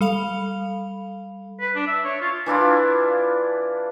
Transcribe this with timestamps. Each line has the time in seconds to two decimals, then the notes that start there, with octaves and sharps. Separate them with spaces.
0.01 G3 A4 F5 B5 F7
1.60 B4
1.75 D4
1.87 E5
2.05 C#5
2.21 F4
2.46 E3 D4 E4 F4